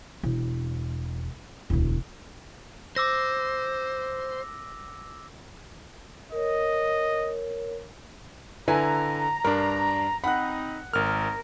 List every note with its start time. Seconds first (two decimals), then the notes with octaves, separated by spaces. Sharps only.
0.23 E1
1.70 E1 D2
2.96 C5 D6 E6 A#6
6.32 A#4 C#5 D#5
8.68 D3 E4 B4 G#5 A#5
9.44 G2 D4 A#4
10.24 C4 D#4 F#5 B5 F#6
10.93 G#1 A#4 F6